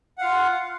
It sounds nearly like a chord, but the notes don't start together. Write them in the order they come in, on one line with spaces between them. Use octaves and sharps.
F#5 F5 F4